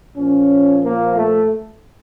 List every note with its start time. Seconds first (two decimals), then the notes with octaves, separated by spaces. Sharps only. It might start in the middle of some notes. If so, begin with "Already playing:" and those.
0.16 A#2 F3 C#4
0.83 A#3
1.16 A3